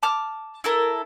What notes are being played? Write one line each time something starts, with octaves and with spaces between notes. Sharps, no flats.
A5 D6 F6
E4 A4 A#4